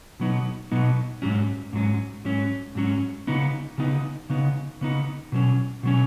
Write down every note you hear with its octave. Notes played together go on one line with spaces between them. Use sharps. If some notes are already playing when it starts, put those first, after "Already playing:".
B2 F#3 B3 D#4
B2 F#3 B3 D#4
G#2 F#3 C#4
G#2 F#3 C#4
G#2 F#3 C#4
G#2 F#3 C#4
C#3 B3 D#4
C#3 B3 D#4
C#3 B3 D#4
C#3 B3 D#4
B2 F#3 C#4
B2 F#3 C#4